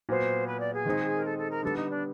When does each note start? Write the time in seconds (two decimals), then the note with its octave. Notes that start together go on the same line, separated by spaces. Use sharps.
0.09 A#2 F#3 B3 C5
0.47 B4
0.60 D5
0.73 G#4
0.85 D#3 G#3 C4 D#4
1.15 A#4
1.24 A4
1.37 A4
1.50 A#4
1.63 D3 G3 B3 A4
1.76 D#4
1.89 D4